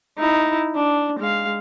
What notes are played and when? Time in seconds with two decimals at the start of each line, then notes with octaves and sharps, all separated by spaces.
0.18 D#4 E4
0.75 D4
1.19 G#3 F5